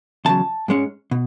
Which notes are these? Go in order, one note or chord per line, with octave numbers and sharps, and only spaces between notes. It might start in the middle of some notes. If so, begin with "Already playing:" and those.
E2 C#3 F#3 A5
G#2 G#3 C#4
B2